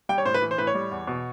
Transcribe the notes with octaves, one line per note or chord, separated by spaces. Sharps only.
G3 G5
C#5
A2 C5
B4
E3
C5
A2 B4
C#5
G3
E2
B2